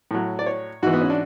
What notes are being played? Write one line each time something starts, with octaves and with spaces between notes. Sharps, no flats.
A2 F#3
D5
C#5
G#2 E3 F#4
B3
C#4
D4